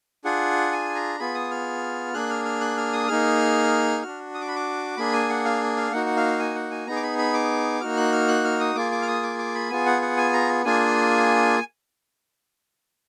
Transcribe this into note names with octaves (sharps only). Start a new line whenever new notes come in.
D4 F4 G#4 F#5
G#5
A#5
B3 F4 G#4 B5
D#6
F6
A#3 D4 G#4 F#6
F6
F6
F#6
F6
D#6
A#3 D#4 G#4 F6
D4 F#4 F6
D#6
D6
B5
D6
A#3 D4 G#4 B5
G#5
F#5
F5
F5
A#3 D#4 F#4 F#5
F#5
F5
G#5
F#5
G#5
B3 D#4 G#4 A#5
D6
B5
B5
D6
A#3 D#4 F#4 F6
F#6
F6
F#6
F6
D#6
A#3 F4 G#4 D6
D6
F6
D#6
D6
D6
B5
B3 F4 G#4 G#5
F#5
F#5
G#5
A#5
A#3 D4 F4 G#4 G#5